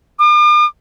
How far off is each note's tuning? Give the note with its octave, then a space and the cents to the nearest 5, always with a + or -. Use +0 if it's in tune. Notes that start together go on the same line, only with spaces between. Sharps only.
D6 +45